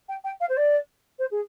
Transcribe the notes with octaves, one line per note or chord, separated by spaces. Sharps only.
G5
G5
F5
C5
D5
C5
G#4